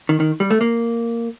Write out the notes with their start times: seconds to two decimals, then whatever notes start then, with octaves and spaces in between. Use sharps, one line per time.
0.09 D#3
0.20 D#3
0.40 G3
0.51 A3
0.61 A#3